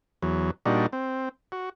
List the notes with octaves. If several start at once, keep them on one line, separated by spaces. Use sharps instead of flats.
E2 F#3
A#2 G3 D4 D#4 F#4
C4
F#4